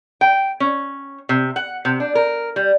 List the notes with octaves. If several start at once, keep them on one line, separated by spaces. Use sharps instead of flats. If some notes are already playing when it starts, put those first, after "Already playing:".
G5
C#4
C3
F#5
C3
D4
A#4
G3